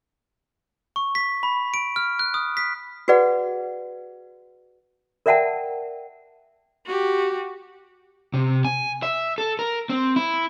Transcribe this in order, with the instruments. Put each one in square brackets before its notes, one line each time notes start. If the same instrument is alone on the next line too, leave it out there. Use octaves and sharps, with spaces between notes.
[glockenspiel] C#6
B6
B5
D7
F6
F#6
D#6
B6
[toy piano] F#4 G#4 B4 D5 F#5
A#4 D5 E5 F#5 G5 A5
[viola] F#4 G4
[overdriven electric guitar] C3
G#5
E5
A4
A#4
C4
E4